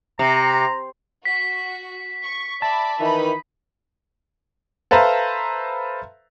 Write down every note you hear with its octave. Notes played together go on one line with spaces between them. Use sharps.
C3 A#5
F#4 B6
C#6
D5 E5 A5 B5
D#3 E3 D#4 B5
A4 B4 C5 E5 F5 A#5